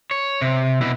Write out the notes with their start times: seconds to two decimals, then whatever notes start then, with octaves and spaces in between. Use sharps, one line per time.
0.11 C#5
0.41 C3
0.81 B2 E4